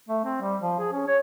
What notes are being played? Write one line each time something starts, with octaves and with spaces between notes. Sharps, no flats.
A3
C4
G3
F3
G#4
C#4
C#5